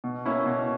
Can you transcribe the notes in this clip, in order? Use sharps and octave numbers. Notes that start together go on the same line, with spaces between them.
B2
A#3 C#4 E4
B2